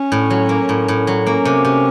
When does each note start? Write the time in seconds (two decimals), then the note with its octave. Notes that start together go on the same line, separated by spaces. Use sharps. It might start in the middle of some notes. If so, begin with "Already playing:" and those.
Already playing: C#4
0.12 A2
0.30 F#3
0.49 A#3
0.69 A2
0.88 A2
1.07 F#3
1.26 A#3 C#4
1.45 C3
1.65 C3